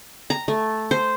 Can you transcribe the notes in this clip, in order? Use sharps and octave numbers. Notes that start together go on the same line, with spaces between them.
A#5
A3
C5